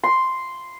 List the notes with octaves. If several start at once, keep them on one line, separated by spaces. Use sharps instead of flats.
C6